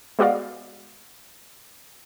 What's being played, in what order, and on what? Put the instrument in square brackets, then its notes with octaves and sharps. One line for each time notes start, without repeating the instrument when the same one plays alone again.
[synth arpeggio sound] G#3 B3 F#4 D5 D#5 F5